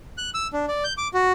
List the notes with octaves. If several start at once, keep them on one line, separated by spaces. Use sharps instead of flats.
F#6
E6
D4
D5
G6
D6
F#4